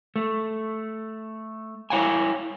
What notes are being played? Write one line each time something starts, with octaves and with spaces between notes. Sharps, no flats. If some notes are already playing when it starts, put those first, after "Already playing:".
A3
E4 C#5 F5 G5 G#5